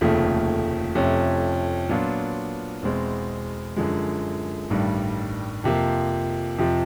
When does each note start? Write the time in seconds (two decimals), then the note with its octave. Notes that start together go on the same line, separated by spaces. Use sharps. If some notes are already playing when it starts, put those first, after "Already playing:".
0.01 F1 D#2 C#3 F3 A3
0.95 F2 C3 F3 A3 C#4
1.89 A#2 F#3 B3 D4 F4
2.83 E2 B2 G#3 C4
3.76 F#2 D3 F3 G#3
4.70 A1 G2 D#3 G3
5.64 F2 C3 F3 A#3
6.58 F2 C3 F3